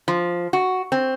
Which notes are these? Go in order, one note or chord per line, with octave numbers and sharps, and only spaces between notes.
F3
F#4
C4